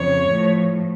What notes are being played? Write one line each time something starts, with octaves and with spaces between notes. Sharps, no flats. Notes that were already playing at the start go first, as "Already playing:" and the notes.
Already playing: F2 C#3 C#5
A2 F3 A3